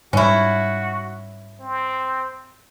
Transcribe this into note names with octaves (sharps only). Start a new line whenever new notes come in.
G#2 G3 C#4 E4 F#4
C4